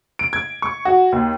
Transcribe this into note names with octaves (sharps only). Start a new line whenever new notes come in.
D7
G#6
C#6
F#4
D#2